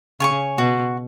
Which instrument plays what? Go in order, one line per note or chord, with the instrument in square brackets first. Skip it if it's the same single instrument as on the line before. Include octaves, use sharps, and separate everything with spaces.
[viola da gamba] C#3 [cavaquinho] C#5 G#5 C#6
[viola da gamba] B2 [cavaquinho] F#4